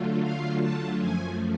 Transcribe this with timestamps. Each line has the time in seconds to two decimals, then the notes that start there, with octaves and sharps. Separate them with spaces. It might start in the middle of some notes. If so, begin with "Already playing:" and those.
Already playing: D3 F#3 A3 F4
0.22 F5
0.61 A5
1.00 F#2 F3 A3 G#5